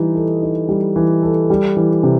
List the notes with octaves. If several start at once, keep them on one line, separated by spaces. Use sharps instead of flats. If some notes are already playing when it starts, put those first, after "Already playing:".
Already playing: E3 G3 D#4
A4
D#4
G3
E3
A4
G3
E3
C3